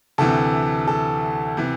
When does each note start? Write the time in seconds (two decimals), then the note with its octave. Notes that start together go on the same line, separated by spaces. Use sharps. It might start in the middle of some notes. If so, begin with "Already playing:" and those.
0.18 D2 C3 E3 A4
0.87 A4
1.57 C3 E3